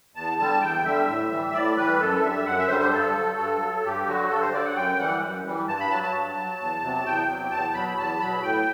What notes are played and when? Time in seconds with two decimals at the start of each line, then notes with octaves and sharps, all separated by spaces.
0.15 E2 A5
0.39 D3 G3 A5
0.61 E2 G5
0.85 D3 G3 E5
1.08 A2
1.31 E3 G3
1.54 A2 D5
1.77 E3 G3 B4
2.00 F#2 A4
2.22 D3 G3 E5
2.46 F#2 F#5
2.58 E5
2.68 D3 G3 C5
2.80 C5
2.92 G2 A4
3.15 F#3
3.38 G2
3.60 F#3
3.84 G2 G4
4.07 D3 F#3 F#4
4.30 G2 A4
4.41 C5
4.52 D3 F#3 D5
4.65 F#5
4.75 F#2 G5
4.99 E3 G3 F#5
5.22 F#2
5.45 E3 G3
5.67 G2 A5
5.80 B5
5.91 F#3 A5
6.03 A5
6.14 G2
6.36 F#3
6.60 E2
6.83 C3 F#3
7.05 E2 G5
7.29 C3 F#3
7.51 E2 A5
7.74 B2 F#3 B5
7.97 E2 A5
8.20 B2 F#3 B5
8.43 A2 G5